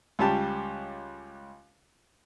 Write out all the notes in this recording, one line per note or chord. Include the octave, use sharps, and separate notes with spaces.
C#2 G3 C#4 G4 A5